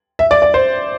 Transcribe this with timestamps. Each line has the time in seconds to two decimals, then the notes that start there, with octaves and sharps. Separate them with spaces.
0.19 E5
0.31 D5
0.42 D5
0.54 C5